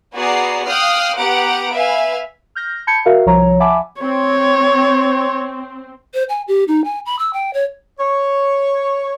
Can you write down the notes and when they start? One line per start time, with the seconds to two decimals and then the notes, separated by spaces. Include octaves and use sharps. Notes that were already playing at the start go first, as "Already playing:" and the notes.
0.14 B3 F#4 G#4 D5 A#5 C7
0.66 F5 G5 D#6 F6 F#6 C7
1.16 B3 G4 F#5 A#5 D7
1.72 B4 E5 F5 G#5
2.55 F6 G6 A#6
2.87 A5 B5 G6 G#6 C#7
3.05 F#4 A#4 E5 F5
3.26 C2 F3 C#5 A#5
3.60 E5 F#5 G#5 A5 B5 D6
4.01 C4 C#5
6.14 C5
6.29 G#5
6.48 G4
6.68 D#4
6.85 G#5
7.06 B5
7.19 E6
7.33 G5
7.54 C#5
7.99 C#5